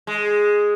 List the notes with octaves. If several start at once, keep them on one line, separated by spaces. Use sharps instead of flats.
G#3